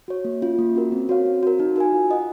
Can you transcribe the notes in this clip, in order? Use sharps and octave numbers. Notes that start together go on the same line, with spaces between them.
F#4 C#5
A#3
C#4 F4
A#3
C#4 F#4 A#4
C4
F#4 C#5 F5
C4
F#4 A#4
D#4
F#4 A#4 F5 G#5
F4
A#4 D#5 F#5